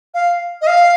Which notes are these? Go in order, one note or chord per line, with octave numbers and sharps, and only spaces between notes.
F5
D#5
F5